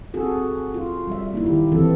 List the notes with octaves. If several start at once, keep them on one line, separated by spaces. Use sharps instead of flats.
C4 F#4 G#4 A4
F4
G3 E5
A#3 D#4 E4
D#3 E4 G4
E3 C4 A4